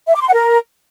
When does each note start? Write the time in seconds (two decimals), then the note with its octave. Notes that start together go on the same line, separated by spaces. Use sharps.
0.08 E5
0.14 D6
0.21 C6
0.27 F#5
0.33 A#4